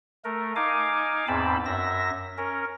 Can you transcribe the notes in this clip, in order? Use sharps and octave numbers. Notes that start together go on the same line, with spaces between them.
A3 A#4
D#4 F5 G#5 D6
E2 G#2 C4 A5 B5
F#2 E5 A#6
C#4 A#4